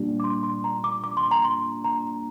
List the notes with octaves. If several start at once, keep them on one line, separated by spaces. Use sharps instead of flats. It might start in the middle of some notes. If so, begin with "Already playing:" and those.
Already playing: A#2 G3 D4
D6
C6
C6
A#5
D6
D6
C6
A#5
C6
A#5